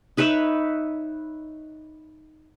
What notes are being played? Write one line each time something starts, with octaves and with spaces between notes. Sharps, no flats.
D#4 B4 C#5 E5